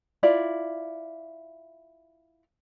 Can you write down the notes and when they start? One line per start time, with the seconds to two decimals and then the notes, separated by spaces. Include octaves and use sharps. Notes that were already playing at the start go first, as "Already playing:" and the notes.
0.23 E4 F4 D5